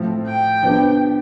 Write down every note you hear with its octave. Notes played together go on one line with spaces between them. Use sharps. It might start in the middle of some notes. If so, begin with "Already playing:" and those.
Already playing: A2 F3 C4
G5
F3 B3 D4 G4